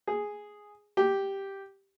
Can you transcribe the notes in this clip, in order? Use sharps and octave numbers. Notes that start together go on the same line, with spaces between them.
G#4
G4